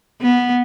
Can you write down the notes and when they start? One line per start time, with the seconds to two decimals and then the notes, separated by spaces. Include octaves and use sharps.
0.22 B3